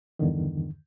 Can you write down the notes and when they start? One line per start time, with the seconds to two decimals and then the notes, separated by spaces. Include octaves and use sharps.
0.19 E2 G2 D3 D#3